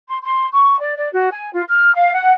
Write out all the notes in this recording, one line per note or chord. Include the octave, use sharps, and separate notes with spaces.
C6
C6
C#6
D5
D5
F#4
G#5
F4
F6
F5
F#5